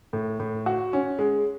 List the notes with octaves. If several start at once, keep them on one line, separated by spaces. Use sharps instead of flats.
A2
A2
F#4
C#4
G#3